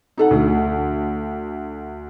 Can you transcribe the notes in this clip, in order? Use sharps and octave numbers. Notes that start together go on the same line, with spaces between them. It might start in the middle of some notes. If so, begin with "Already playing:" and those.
D#4 A4 F#5
D2